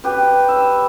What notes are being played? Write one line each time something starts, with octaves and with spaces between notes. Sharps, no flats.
G4 B4
E5